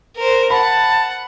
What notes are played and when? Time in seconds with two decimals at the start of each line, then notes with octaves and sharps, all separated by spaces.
0.16 A#4 C5
0.50 F#5 A5 B5